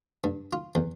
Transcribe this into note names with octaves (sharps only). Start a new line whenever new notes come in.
G2
F4
E2